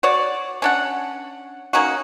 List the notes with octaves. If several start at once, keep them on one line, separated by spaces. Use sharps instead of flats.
F#4 C#5 D5
C#4 D4 F#5
A#3 C#4 D#4 F#4